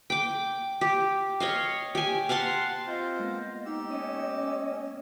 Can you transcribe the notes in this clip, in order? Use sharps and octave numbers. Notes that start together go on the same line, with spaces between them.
G5 D6
G4
C#5 D#5 F5
G4 G#5
F5 F#5 A5 C6
C4 F4 C5 D#5
G#3 A#3 B3
D#4 G4 E6
C#4 C#5 D#5